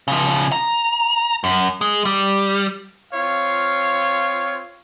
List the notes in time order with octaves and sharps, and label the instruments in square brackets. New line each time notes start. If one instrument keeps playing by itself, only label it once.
[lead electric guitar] C#3 F3
A#5
F#2
G#3
G3
[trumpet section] C4 F4 C#5 F5